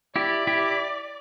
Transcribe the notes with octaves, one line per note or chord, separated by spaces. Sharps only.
E4 G4 D5
E4 G4